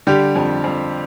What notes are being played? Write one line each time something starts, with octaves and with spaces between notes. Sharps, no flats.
D3 G3 G4
F2
F2